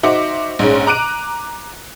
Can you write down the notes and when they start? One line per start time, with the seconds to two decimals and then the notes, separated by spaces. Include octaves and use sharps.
0.03 D#4 F#4 C5 E5 D6
0.59 A#1 G#2 C#4
0.87 A#5 D6 F#6 D7 D#7